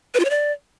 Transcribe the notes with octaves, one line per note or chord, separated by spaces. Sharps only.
B4
F4
C#5
D5